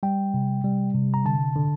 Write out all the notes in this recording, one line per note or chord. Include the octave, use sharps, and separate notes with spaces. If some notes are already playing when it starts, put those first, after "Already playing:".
G3 G5
C3
G3
C3
A#5
D3 A5
D3